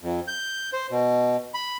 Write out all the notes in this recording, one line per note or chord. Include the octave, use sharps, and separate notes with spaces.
F2
G6
C5
B2
B5